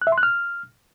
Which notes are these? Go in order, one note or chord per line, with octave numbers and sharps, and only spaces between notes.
F#6
E5
C6
F#6
F6